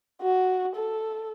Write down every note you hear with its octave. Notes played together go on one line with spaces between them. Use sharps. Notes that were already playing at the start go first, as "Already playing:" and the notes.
F#4
A4